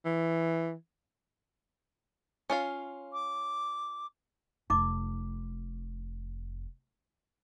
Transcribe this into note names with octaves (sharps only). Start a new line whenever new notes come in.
E3
C#4 F4 F5
D6
F1 D#4 D6